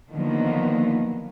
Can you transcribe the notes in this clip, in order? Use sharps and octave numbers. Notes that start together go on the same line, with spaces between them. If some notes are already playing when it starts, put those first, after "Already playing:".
D3 D#3 F3 F#3 A#3 B3